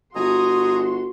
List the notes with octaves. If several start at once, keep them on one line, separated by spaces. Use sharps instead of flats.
G1 F#4 D#5 G#5 A#5 C6 D#6